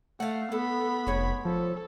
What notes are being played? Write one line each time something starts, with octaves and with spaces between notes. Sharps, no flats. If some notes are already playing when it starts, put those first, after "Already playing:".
A3 F5 F#5
B3 A4 B5
F1 G#3 C#5
F3 A4